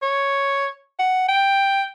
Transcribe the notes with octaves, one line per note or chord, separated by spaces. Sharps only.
C#5
F#5
G5